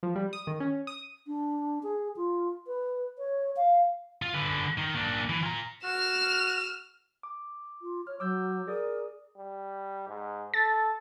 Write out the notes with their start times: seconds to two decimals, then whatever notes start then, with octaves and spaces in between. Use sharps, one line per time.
0.03 F3
0.16 G3
0.33 D#6
0.47 D#3
0.60 C#4
0.87 D#6
1.27 D4
1.83 G#4
2.16 F4
2.67 B4
3.18 C#5
3.56 F5
4.22 F4
4.34 D3 B4
4.78 D#3
4.95 A#3 D4
5.29 E3
5.43 F4 A#5
5.84 F#4 F6 E7
7.23 D6
7.82 F4
8.07 C#5 F6
8.20 F#3 D6 E6 G6
8.68 G#4 A#4 D5 D#6
9.37 G3
10.08 G#2
10.54 A4 A6